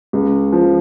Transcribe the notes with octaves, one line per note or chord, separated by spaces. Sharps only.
C#2
F3